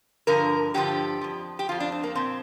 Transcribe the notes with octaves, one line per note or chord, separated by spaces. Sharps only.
G2 D3 F3 A#4
G2 D3 F3 G4
F2 F3
G4
F2 F3 F4
D4
C4
A#3
A#2 F3 C4